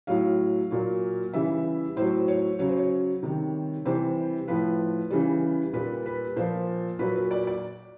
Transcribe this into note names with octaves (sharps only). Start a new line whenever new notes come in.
A2 F#3 F5
A#2 F#3
C#3 E3 G3 E5
A2 F#3 C5
C#5
C#3 F#3 C#5
C5
C#5
C3 D#3 G3
C3 E3 G3 C5
A2 F3 B4
C#3 E3 G3
A#2 G3 B4
B4
A#2 F3 C5
A#2 F#3 B4
B4
D5
D5